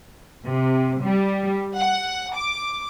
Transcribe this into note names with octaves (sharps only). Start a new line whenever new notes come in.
C3
G3
F#5
D6